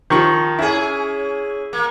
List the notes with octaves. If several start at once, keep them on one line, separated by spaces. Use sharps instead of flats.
D#3 F3 C#6
C#4 E4 G#4 G#5
A#3